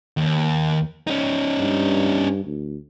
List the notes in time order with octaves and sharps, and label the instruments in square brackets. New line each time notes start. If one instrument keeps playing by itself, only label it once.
[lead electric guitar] D#2
C#4 D#4
[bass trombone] G2
D2